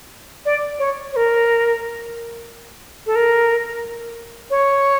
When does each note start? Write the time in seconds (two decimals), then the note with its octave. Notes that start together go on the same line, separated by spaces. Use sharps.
0.45 D5
0.79 C#5
1.13 C#5
1.16 A#4
3.06 A4
3.15 A#4
4.50 C#5